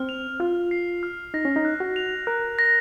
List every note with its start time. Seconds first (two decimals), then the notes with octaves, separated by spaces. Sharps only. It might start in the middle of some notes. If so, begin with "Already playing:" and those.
Already playing: C4 F6
0.09 F7
0.40 F4 F6
0.71 C7
1.03 F6
1.34 D#4 A#6
1.45 C#4
1.56 D#4
1.65 F#6
1.80 F#4
1.96 F7
2.27 A#4 F#6
2.59 A#6